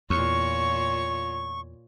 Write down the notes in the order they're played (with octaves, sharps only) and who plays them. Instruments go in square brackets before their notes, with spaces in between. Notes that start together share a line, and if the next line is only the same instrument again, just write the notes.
[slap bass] E2 [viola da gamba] A#2 F4 C#5 [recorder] C#6